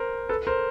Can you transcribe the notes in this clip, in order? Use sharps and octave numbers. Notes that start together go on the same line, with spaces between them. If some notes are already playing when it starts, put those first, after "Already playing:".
Already playing: A#4 C5
A4 B4
A#4 C5